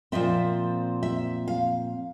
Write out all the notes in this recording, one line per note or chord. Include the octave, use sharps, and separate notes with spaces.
A#2 F3 C4 E5
E5
F5